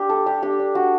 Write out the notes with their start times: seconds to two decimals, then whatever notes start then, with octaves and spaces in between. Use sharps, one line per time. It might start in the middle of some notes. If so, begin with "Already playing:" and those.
Already playing: D4 G4
0.09 G3 A4
0.26 D4 G4
0.42 D4 G4
0.59 D4
0.75 D4 F#4